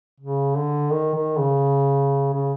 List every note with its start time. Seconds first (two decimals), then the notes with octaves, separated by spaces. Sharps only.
0.20 C#3
0.56 D3
0.91 D#3
1.14 D#3
1.38 C#3
2.34 C#3